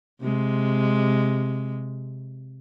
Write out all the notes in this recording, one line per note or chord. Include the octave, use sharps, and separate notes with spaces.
C3 G#3